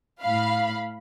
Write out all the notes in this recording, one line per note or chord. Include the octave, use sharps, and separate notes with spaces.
A2 F5 B5